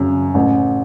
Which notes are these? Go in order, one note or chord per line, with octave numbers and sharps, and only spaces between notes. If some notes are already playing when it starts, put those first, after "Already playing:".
Already playing: G#1 F#2 C#3
A1